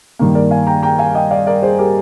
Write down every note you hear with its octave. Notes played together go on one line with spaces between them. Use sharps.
G2 D#3 A#3
A#4 D5
F5 G#5
G5 A#5
G5 A#5
F5 G#5
D#5 G5
D5 F5
A#4 D5
G#4 C5
G4 A#4